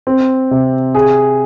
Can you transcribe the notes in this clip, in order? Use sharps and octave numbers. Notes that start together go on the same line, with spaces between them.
C4
C3
G#4